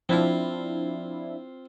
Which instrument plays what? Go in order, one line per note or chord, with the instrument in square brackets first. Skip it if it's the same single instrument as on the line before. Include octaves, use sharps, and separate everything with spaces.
[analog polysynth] F3 D4 E4 [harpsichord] C4 F4